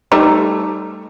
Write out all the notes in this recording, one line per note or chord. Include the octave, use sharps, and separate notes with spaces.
G3 A3 D#4